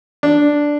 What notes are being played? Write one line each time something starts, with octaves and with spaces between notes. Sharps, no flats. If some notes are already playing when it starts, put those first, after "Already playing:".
D4